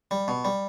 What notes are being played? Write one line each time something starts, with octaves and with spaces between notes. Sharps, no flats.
G3
B2
G3